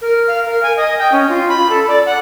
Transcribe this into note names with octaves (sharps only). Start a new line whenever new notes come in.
A#4
F5
A#4
G#5
D#5
G5
C#4
F4
B5
A4
D5
F#5